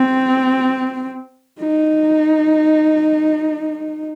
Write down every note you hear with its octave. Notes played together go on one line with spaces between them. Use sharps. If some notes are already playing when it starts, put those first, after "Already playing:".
Already playing: C4
D#4